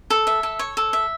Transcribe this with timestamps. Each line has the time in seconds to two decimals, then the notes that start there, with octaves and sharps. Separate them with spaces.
0.10 A4
0.27 E5
0.43 A4
0.59 C#5
0.77 A4
0.93 E5